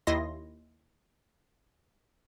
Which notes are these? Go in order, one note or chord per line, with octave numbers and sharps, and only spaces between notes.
D#2 E4 D#5 C6 A#6